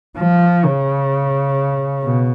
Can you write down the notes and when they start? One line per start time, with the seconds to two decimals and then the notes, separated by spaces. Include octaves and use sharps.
0.19 F3
0.65 C#3
2.04 B2